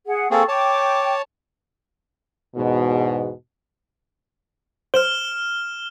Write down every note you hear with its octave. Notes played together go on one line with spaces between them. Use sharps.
G#4 F#5
A#3 C4 G#4 A4 F5 C#6
C#5 G5 A5 D6
E2 G#2 B2
C5 F6 E7 G7